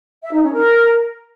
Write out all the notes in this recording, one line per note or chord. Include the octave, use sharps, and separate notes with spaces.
E5
D#4
C#4
A#4